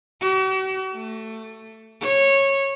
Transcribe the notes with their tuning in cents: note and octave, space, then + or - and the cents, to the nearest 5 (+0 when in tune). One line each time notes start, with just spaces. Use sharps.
F#4 +45
A3 +10
C#5 -15